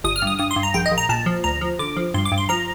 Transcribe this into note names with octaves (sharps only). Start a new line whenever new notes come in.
G1 D#6
F6
G2
D#6
G2 D#6
C6
G2
A#5
A#1 G5
D#5
A#1
A#5
A#2 A5
F3
D2 A#5
F3
D3 D6
F3
G2 C6
D6
G2
C6
F3 A#5